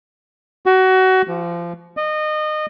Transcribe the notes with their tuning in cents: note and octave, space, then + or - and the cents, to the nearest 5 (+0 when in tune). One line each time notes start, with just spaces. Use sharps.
F#4 +25
F3 -25
D#5 -25